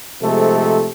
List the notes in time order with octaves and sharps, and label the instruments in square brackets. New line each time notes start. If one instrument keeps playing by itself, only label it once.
[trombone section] C3 F3 G#3 A3 A4